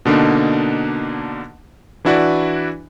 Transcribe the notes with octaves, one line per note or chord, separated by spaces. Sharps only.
B2 D3 A#3 D4 D#4
E3 D4 E4 F#4 B4 D5